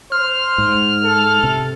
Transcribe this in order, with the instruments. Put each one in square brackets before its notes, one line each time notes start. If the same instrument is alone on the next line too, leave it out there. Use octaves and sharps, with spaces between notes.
[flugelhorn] C5 [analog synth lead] F6
[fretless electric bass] G#2
[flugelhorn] A4
[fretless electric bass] C3